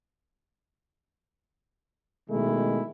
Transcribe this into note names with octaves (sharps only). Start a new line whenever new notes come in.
B2 D#3 G#3 A3 E4